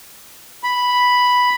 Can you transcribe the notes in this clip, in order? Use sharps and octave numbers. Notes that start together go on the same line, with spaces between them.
B5